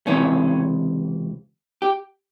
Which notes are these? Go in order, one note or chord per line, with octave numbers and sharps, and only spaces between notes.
C#2 C3 E3 C#4
G4